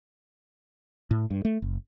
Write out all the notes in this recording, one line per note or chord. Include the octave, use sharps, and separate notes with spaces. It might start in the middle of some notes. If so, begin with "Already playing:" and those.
A2
G2
A3
F#1